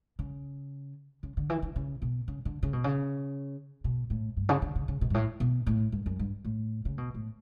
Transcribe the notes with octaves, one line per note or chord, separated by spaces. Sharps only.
C#3
C#3
D3
E3
D3
C#3
B2
C#3
D3
C#3
B2
C#3
B2
A2
G2
C#3
D3
C#3
C#3
B2
G2
A2
B2
A2
G2
F#2
G2
A2
C#3
B2
A2